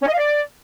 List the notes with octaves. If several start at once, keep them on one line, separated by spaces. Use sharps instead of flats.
C#4
D#5
F5
D5